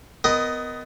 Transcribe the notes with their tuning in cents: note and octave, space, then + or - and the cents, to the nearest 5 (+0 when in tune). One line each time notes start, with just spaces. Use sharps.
B3 +30 A#4 +5 D#5 +0